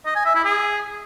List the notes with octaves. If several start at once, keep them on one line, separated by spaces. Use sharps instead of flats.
D#5
G#5
E5
E4
G#4